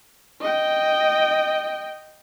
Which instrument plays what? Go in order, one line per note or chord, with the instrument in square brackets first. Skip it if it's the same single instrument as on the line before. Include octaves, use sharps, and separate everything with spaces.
[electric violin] D#5 G5